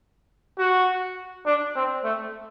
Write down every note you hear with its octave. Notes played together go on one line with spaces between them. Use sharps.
F#4
D4
C4
A3